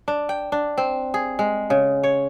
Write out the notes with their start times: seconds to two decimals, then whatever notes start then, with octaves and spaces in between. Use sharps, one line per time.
0.08 D4
0.29 G5
0.52 D4
0.78 C4
1.14 G#4
1.39 G#3
1.70 C#3
2.04 C#5